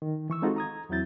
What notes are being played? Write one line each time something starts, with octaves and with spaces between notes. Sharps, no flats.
D#3
E3 C#6 E6
G#3 C4 D#4 F4 F#4 A4
A#5 D#6 G#6
E2 F#3 C4 E4 G6 A6